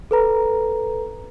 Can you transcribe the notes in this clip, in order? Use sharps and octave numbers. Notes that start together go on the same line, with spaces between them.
A4 B4 A#5